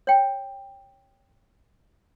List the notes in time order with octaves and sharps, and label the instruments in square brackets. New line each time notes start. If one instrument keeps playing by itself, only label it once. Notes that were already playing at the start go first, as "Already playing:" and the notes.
[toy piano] C#5 G5